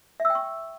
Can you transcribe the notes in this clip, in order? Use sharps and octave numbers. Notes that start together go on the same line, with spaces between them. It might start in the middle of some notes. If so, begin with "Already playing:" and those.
E5
E6
G5
C#6